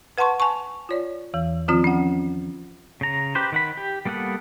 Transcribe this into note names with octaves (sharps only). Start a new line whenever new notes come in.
B4 F#5 A5 C6 C#6
G#5 A5 C#6
F4 C#5 D5
E2 E3
D#3 F3 C4 F4 D#6
C#4 F#5
C#3 A#5
G4 B4 C5
D#3 F#5 B5
G4
G3 A#3 B3 A4 F#5